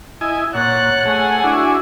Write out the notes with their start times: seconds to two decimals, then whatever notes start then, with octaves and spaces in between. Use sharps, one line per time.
0.21 E4 D#5 G#5
0.54 A#2 C#5 F#5 F#6 A6
1.06 A3 G#4 G#5
1.44 D4 E4 F#4